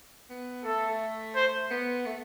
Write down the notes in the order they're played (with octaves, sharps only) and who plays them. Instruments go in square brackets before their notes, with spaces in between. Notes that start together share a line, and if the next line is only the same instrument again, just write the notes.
[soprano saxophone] B3
[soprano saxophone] A3 [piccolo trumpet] A4
[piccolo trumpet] C5
[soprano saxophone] B3
A3